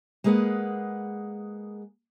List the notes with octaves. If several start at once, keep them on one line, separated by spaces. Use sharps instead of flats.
G#3 A#3 G#4 B4 F#5